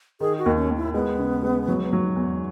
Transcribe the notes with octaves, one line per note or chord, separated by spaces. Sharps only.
D#3 G#4
F#4
D#2
C#4
D#2
E4
G#3 B3
C#3
G#3
F#3
F#3
E2